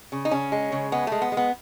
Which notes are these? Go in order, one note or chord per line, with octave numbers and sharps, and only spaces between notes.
C#3
D#4
C#3 C#4
G#3
C#3
G#3 B3
G#3 A3
B3
G#3
B3